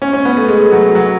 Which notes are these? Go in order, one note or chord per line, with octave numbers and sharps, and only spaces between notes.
C#4
C#4
B3
A3
G#3
F#3
F#3